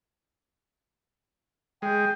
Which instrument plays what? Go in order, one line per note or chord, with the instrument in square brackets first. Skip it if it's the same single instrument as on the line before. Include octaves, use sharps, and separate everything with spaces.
[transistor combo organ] G#3 [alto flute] G5